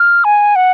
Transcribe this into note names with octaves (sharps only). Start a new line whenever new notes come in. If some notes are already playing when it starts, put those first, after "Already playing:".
Already playing: F6
G#5
F#5